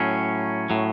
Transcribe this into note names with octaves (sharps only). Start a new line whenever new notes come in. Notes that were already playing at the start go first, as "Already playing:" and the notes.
Already playing: A2 F#3 C#4
A2 F#3